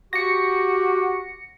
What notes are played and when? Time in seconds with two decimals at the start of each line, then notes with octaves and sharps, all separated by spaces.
0.13 F#4 G4 A#6 C#7